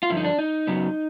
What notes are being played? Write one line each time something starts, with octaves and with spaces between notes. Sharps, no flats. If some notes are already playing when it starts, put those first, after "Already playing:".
F4
G2 D3 F3 E4
D#4
D4
D#4
F#2 C#3 F#3 B3